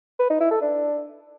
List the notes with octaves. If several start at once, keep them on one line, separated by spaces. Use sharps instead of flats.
B4
D#4
E4
A4
D4